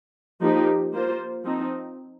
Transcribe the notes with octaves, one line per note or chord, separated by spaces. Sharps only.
F3 A#3 D#4 G4
A#3 F4 C5
F3 C4 D#4